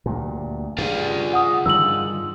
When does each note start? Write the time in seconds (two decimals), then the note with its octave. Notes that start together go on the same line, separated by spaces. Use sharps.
0.06 D2 G2 A#2
0.78 G2 D3 F4 G#4
1.33 F#5 D#6
1.66 G2 D3 D#3 E6 F#7